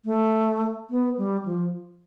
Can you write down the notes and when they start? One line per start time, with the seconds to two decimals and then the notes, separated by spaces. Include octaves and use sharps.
0.05 A3
0.90 B3
1.17 G3
1.46 F3